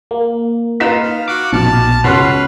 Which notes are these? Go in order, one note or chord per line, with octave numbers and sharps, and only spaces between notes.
A#3
D#4 F4 B4 B6 E7
F5
F#4 D6
A#1 B2 A5 D6 F6
C#2 B2 C#4 B4 C6 F6 C7